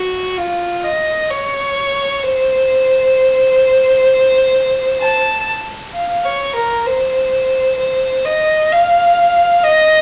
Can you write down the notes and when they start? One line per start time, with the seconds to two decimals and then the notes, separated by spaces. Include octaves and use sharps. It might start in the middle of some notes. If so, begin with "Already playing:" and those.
Already playing: F#4
0.37 F4
0.84 D#5
1.30 C#5
2.23 C5
5.00 A5
5.93 F5
6.25 C#5
6.55 A#4
6.86 C5
7.79 C5
8.25 D#5
8.72 F5
9.64 D#5